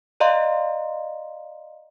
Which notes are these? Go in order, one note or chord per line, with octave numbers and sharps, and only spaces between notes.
D5 D#5 F5 A#5 C6